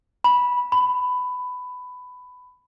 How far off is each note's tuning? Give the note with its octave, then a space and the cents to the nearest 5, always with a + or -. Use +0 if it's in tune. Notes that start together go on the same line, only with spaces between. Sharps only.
B5 -10
B5 +15